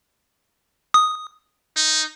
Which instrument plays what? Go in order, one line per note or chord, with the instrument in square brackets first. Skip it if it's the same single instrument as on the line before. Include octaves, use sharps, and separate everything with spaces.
[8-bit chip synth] D#6
[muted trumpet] D#4